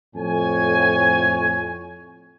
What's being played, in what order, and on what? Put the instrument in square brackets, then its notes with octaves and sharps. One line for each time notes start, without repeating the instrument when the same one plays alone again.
[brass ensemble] F2 A2 C#5 G#5